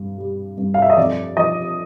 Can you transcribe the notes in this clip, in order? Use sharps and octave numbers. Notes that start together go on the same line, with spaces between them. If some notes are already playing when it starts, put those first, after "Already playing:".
Already playing: G2
G3
G2
F5
E5
D#5
F2 D5
F3 D#5